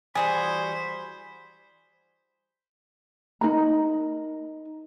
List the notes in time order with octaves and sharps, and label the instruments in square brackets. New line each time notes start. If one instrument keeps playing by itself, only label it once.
[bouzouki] E3 G3 F#4 [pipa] G#4 [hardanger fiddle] C5 [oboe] B5
[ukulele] D#4 A#4 A#5